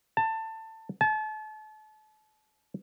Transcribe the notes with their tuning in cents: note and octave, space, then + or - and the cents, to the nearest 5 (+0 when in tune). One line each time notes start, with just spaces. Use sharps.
A5 +20
A5 -35